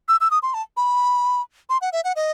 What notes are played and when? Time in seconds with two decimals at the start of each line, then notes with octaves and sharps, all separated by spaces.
0.08 E6
0.21 E6
0.31 D#6
0.43 C6
0.54 A5
0.77 B5
1.69 C6
1.81 F#5
1.93 E5
2.04 F#5
2.16 D#5